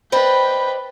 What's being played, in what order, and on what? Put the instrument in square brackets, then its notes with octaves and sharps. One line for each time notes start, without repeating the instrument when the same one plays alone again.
[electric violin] B4 G5 [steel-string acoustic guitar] C5 D5 D#5 [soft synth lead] B5